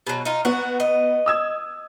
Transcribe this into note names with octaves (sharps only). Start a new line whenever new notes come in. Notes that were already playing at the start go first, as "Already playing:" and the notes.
B2 F#3
D#4 F4
B3 F#4
D#5
D#6 E6 G#6